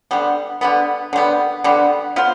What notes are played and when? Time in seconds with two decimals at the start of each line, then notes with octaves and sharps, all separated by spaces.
0.11 D3 G3 B3
0.61 D3 G3 B3
1.13 D3 G3 B3
1.64 D3 G3 B3
2.16 B3 F4 C5